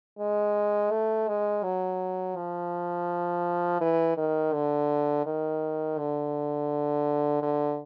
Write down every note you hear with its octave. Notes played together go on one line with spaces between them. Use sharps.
G#3
A3
G#3
F#3
F3
E3
D#3
D3
D#3
D3
D3